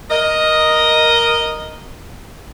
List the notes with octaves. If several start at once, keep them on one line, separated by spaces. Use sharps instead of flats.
A#4 D#5